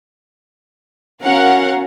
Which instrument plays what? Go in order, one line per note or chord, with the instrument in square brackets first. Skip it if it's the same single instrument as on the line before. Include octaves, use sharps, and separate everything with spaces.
[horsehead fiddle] C#4 F#4 [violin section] A#4 F5 F#5